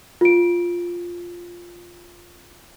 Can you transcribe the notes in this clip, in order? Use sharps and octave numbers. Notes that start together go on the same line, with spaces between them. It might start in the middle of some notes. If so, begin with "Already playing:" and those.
F4 D7